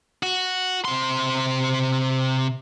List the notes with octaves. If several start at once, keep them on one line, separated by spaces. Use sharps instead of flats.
F#4
C3 C6